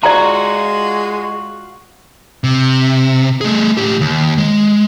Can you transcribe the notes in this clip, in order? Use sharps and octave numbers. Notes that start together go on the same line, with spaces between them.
G#3 F4 F#4 D5 A#5
C3
A3 G#4
A2 G4
D#2
G#3